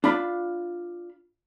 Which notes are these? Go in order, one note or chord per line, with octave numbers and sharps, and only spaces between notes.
D4 F4 F5 B5